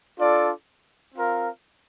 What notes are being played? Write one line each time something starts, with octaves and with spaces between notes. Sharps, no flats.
D4 F4 A4 D5
C4 F4 A#4 F5